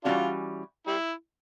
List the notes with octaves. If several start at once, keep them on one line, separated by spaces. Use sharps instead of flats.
E3 G3 A#3 C#4 D4 F4 F#4
G3 E4